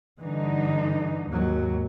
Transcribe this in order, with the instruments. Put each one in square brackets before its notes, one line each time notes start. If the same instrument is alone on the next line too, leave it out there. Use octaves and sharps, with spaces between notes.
[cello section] G2 D3 D#4 [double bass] E3
[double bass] D#2 F#3 [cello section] G#2